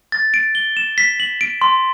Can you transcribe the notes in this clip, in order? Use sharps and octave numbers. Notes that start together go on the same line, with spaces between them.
A6
D7
G7
E7
B6
F#7
D7
C6